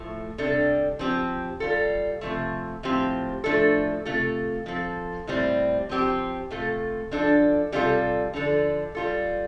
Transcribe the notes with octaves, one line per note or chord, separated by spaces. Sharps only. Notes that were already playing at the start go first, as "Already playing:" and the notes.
Already playing: A2 F3 A3
C3 G3 D4 A4
F3 C4 G4
G3 F4 A4
C3 F3 A3
A2 F3 C4 G4
A2 F3 A3 D4 A4
C3 A3 F4 A4
F3 C4 A4
A2 G3 C4
F3 C4 G4
C3 A3 F4 A4
F3 D4 A4
C3 G3 D4 F4 A4
D3 F3 D4 A4
G3 F4 A4